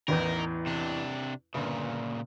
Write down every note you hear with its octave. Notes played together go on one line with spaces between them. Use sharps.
A1 E2 E3 D#4 A#4
C3 D4
G1 A#2 C#3